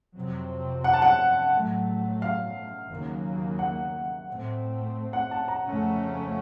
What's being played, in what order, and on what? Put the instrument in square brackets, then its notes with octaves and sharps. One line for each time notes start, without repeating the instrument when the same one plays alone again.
[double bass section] F2 C3 F#3 C4
[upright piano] F#5
A5
F#5
[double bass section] A2 F#3 A3
[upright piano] F5
[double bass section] D#2 C#3 F#3 A#3
[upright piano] F#5
[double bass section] A2 A3 C4
[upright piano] F#5
A5
A#5
[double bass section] F2 C#3 A3 C#4